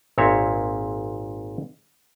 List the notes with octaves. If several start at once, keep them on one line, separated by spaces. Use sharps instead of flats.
G#1 A#2 C4 C#5 E5